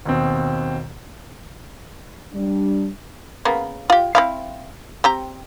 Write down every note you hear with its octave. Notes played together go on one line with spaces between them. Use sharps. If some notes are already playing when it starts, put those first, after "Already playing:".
D#2 B2 C4
G3 D4
C#3 A#3 B3
F4 G4
C4 E4 F5
C4 G4 A#5